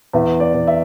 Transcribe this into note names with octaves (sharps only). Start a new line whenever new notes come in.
E2 E5
D5
E2
E5